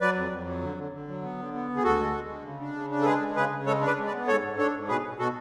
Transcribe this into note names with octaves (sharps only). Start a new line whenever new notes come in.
F#3 B4 D5
F2
F2
F#3
D3
D3
D3
F#3
B3
D3
B3
D2
G#4
D2 F#4 A4
G#3
G#3
D3
C#3
D4
C#3
D4
A4
G#3 G#4 B4
G#3
C#3 G#4 B4
C#3
G#3 A4 C#5
D4
B4 D5
G#3
B4 D5
B3
G#2 A4 C#5
G#2
D4 A4 C#5
G#2
B2 G#4 B4
B2
B2 F#4 A4